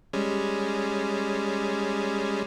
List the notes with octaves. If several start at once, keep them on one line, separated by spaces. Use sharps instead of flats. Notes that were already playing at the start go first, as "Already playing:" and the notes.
G3 G#3 C#4